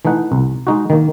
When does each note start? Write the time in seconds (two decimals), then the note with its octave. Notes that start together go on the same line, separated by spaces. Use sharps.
0.05 E3 A3 D#4 F#5
0.32 C2
0.67 G#3 D#4 F#4
0.90 D#3 A#3